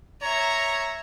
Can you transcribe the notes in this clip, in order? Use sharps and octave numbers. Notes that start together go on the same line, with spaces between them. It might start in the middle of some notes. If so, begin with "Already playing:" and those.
C#5 E5 A#5